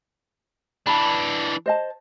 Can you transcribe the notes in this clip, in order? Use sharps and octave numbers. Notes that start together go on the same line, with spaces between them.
E3 D4 A5 B5
C5 D#5 A5